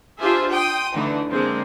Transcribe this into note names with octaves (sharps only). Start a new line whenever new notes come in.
D4 F4 G4 G#4 C5 E5
G5 C6 D#6
D3 E3 A3 D#4
D3 G#3 A#3 C4